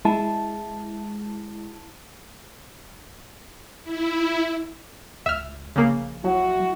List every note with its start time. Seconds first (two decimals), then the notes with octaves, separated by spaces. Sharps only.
0.05 G#3 E4 A5
3.83 E4
5.26 C#2 E5 F6
5.76 A#1 C#3 A#3
6.24 F#3 E4 F#4